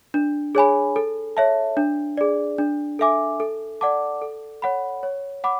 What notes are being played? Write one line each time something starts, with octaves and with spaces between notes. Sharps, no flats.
D4
G#4 C#5 G#5 B5
A4
C#5 E5 A5
D4
G#4 D5
D4
A4 E5 G#5 D6
A4
D5 F#5 A5 D6
A4
C#5 F#5 B5
C#5
F#5 B5 D6